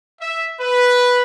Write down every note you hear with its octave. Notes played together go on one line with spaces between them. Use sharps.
E5
B4